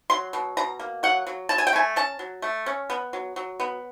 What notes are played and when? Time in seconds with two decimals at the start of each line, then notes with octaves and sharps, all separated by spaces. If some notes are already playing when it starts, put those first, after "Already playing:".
0.10 F#3 C6
0.33 B2
0.57 B2 A#5
0.80 A#3
1.03 F#3 F#5
1.27 F#3
1.49 F#3 A5
1.58 G#5
1.67 G5
1.73 A3 G#5
1.96 C#4 A5
2.19 F#3
2.42 A3
2.66 C#4
2.90 B3
3.13 F#3
3.36 F#3
3.60 B3